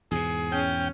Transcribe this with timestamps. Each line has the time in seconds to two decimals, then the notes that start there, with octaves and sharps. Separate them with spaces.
0.11 E2 G#2 B2 G#4
0.52 C#4 G5